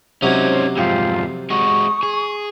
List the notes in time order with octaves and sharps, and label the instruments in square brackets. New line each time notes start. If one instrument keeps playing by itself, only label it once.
[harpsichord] C3 F#3 [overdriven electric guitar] C#4 D#4 [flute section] C5 G#6
[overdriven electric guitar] F2 G#2 [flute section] F4 G4
[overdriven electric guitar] G#3 F#4 [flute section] C#6 D#6
[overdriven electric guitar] G#4